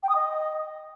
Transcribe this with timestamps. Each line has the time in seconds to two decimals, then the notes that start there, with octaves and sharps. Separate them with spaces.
0.03 G5
0.09 D#6
0.15 D#5